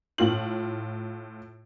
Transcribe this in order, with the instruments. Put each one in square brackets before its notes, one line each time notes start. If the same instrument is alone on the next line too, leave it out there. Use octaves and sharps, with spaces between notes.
[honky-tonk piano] A2 F4 F#7